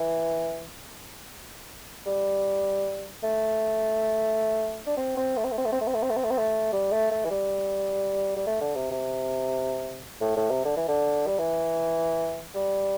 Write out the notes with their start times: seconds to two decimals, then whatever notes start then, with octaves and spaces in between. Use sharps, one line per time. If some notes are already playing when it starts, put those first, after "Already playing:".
Already playing: E3
2.06 G3
3.23 A3
4.86 D4
4.97 C4
5.17 C4
5.37 A3
5.44 C4
5.52 A3
5.58 C4
5.65 A3
5.72 C4
5.81 A3
5.87 C4
5.94 A3
6.02 C4
6.10 A3
6.16 C4
6.24 A3
6.30 C4
6.38 A3
6.73 G3
6.92 A3
7.11 A3
7.24 E3
7.30 G3
8.36 G3
8.47 A3
8.61 D3
8.76 C3
8.91 C3
10.21 A2
10.37 A2
10.50 C3
10.65 D3
10.77 E3
10.88 D3
11.27 G3
11.38 E3
12.55 G3